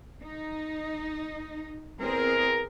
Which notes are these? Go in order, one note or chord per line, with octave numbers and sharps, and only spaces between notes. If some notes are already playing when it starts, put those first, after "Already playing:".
D#4
E2 C4 G#4 A#4